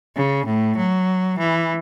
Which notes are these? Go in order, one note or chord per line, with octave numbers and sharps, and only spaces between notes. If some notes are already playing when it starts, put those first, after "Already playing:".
C#3
A2
F#3
E3